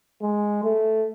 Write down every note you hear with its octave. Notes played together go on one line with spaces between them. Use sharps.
G#3
A3